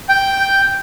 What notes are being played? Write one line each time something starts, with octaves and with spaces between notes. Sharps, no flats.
G5